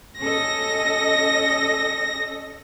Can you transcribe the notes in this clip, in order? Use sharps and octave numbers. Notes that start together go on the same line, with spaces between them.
C#4 A4 D#5 A#6